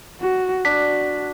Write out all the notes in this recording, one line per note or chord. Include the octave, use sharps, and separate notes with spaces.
F#4
D4 F#4 B6